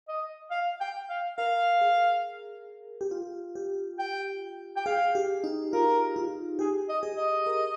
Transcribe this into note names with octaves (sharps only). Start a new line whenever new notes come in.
D#5
F5
G5
F5
A#4 F5
G#4
G4
F4
G4
G5
G5
G#4 F5
G4
D#4
F4 A#4
F4
G4 G#4
D#5
G#4
D#5
A#4